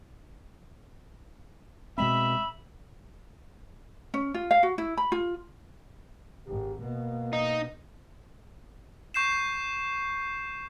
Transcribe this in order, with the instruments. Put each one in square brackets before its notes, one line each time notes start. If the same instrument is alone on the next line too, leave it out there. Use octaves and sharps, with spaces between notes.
[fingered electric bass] B2 G#3 C4 [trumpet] E5 [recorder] B5
[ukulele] C#4
F4
F5
F#4
E4
B5
F4
[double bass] G#1 [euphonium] G4
[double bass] B2 [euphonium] A#3
[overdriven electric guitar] D#4
[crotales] C#6 G6 C7 E7